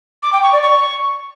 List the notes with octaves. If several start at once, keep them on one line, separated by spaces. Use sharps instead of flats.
D6
G5
C#6
D5
C#6